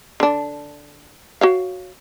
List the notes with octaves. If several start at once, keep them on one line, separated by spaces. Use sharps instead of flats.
D3 D4
F#4 C#5 F5